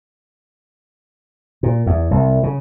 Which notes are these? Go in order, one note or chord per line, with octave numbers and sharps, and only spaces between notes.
A#2
E2
C2
C#3